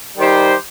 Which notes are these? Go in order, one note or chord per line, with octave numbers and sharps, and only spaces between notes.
D#3 G3 D#4 G4 C5